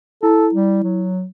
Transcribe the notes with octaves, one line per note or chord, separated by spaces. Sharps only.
E4 A4
G3
F#3